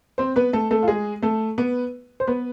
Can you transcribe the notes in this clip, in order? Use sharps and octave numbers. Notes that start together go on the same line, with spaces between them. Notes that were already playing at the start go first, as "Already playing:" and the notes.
C4 C5
B3 B4
A3 A4
A3 A4
F4
G#3 G#4
A3 A4
B3 B4
C5
B3 B4